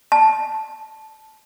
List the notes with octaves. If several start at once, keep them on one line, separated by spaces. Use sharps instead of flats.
A5